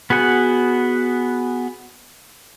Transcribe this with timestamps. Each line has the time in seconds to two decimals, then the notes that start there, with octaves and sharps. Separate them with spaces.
0.10 B3 F#4 G#4 F#5